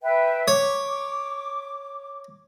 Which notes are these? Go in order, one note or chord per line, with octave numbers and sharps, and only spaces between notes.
B4 E5 G5
C#5 D6